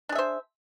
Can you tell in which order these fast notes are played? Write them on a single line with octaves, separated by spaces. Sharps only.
D4 G#4 E5 C5